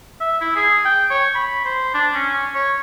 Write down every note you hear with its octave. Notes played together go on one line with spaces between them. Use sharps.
E5
E4
G#4
G5
C#5
B5
C5
D4
C#4
C#5